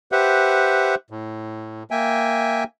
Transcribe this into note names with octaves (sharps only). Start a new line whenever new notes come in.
G4 B4 C5 E5 F#5
A2
A#3 E5 G5 G#5